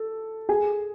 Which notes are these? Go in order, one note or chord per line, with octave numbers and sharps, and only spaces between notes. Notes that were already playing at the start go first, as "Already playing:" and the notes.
Already playing: A4
G#4 G#5